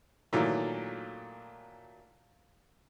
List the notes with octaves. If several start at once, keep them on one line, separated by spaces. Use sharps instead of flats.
A#2 D#3 E3 F#3 A3